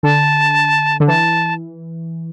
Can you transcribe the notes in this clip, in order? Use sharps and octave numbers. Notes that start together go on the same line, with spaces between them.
D3 A5
D3
E3 A5